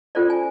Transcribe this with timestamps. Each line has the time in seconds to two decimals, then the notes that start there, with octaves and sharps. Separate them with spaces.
0.15 C#4 F4 A4 C5 D5
0.30 G#5